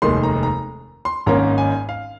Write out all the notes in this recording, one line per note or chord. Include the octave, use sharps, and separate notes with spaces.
F1 D#2 D#3 G#3 C6
A#5
A#5
C6
G#1 G#2 D#3 A#3 C#4 A#5
G#5
F5